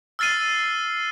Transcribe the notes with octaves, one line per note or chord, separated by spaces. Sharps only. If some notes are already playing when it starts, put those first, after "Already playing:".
E6 F6 A6 C7 D#7